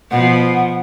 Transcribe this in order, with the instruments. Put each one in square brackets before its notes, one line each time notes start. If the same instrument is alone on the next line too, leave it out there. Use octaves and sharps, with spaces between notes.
[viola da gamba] B2 F3 [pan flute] F#5